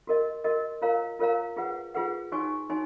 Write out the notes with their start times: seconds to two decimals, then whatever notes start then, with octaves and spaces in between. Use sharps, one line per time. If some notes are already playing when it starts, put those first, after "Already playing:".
0.07 F#4 A#4 D#5
0.44 F#4 A#4 D#5
0.82 F4 A#4 C#5 F5 A#5
1.19 F4 A#4 C#5 F5 A#5
1.56 F4 G#4 B4 F#5
1.94 F4 G#4 B4 F#5
2.32 D#4 F#4 C#5 G#5 C#6
2.69 D#4 F#4 C#5 G#5